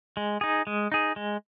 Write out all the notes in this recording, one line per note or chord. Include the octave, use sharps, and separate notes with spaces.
G#3
D#4 G#4
G#3
D#4 G#4
G#3